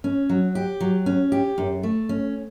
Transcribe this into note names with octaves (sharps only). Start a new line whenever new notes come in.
C#4
F#3
G4
F#3
C#4
G4
F#2
A3
C#4